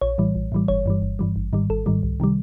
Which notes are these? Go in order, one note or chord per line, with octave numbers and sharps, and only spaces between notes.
A#1 C#5
A2 E3 G3
A#1
A2 E3 G3
G1 C#5
G2 E3 G3
G1
G2 E3 G3
G#1
G#2 D#3 G3
G#1 A4
G#2 D#3 G3
C2
C3 D#3 G3